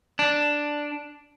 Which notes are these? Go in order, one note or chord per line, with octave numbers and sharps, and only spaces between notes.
D4